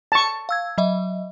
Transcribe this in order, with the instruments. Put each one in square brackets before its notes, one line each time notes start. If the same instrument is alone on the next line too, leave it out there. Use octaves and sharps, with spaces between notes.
[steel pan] A5 C#6
[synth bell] F5 E6 G#6
F#3 D#5 E5